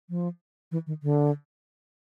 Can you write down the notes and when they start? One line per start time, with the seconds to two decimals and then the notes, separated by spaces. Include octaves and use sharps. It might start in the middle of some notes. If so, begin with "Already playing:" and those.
0.10 F3
0.72 E3
0.87 D#3
1.03 D3